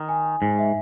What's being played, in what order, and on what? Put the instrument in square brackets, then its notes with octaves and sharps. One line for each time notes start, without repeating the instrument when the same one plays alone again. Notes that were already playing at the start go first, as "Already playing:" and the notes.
Already playing: [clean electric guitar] D#3
[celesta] G#5
G#5
[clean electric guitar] G#2 [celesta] G#5
[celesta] E5